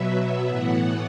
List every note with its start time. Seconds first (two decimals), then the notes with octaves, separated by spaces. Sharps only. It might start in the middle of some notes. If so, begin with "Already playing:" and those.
Already playing: B2 F#3 B3 E5
0.45 A2 E3 B3 F#5